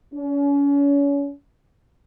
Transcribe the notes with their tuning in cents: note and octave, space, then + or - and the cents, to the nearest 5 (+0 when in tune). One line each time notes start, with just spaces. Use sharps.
C#4 +35